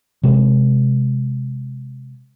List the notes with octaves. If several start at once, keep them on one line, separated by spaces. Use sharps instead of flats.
C3 G#3